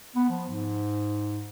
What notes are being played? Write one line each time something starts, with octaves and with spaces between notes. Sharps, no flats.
B3
F3
G#2